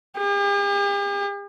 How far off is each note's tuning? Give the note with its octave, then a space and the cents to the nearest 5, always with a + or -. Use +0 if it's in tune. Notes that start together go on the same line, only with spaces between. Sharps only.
G4 +45